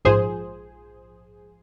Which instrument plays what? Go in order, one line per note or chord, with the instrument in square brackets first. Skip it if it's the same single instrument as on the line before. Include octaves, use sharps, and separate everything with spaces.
[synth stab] A#1 G#2 F3 G#4 C5